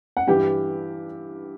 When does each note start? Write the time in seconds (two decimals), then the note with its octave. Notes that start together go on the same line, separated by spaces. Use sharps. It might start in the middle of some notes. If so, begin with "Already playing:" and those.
0.17 F#5
0.27 G2 E3 G4 G5